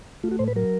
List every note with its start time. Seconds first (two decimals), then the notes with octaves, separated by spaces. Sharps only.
0.23 A3 F4
0.31 F#4
0.39 A2 C5
0.48 B4
0.56 F#3 A#4